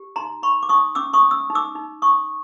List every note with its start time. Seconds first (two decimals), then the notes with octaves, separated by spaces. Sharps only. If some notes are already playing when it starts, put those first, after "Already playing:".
Already playing: G4
0.16 D#4 A#5 C6
0.42 D#4 B5 C#6
0.63 D6
0.69 D#4 C#6 D#6
0.95 C#4 D6 E6
1.13 C#6 D#6
1.22 C#4
1.31 E6
1.50 D#4
1.55 D6 E6
1.75 D#4
2.02 D#4 C#6 D#6